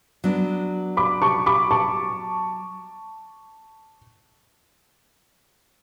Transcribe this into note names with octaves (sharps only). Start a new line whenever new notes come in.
F#3 B3 D4
B5 D6
A5 C#6
B5 D6
A5 C#6